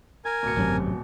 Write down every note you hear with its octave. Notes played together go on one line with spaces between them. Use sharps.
A#4 G#5 G#6
D1 B2 C#7
G#1 F#2 C3 F#3